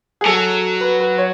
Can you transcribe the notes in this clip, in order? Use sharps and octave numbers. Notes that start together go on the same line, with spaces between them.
G#4
F#3 A4
B4
B4
C#5